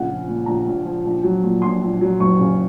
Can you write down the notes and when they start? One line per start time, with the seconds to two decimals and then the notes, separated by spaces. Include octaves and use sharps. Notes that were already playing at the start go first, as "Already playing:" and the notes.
Already playing: A#1 C#3 F#5
0.08 F3
0.28 A#2
0.46 A#1 A#5
0.66 A#1
0.85 F3
1.05 A#1
1.23 F#3
1.43 A#2
1.62 A#1 C6
1.82 A#1
2.01 F#3
2.20 F#1 C#6
2.39 C#3